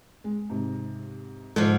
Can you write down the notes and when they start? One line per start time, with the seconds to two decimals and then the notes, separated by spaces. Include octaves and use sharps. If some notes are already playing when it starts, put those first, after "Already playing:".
0.24 G#3
0.50 G#2 C3
1.56 G#2 D3 F3 A4